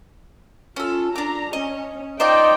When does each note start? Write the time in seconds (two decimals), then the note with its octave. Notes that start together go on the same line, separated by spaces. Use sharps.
0.76 C#4 F4 A4
1.16 D4 A#5 D6
1.53 C#4 D#5
2.20 D#4 F4 C5 D5 D#5 G5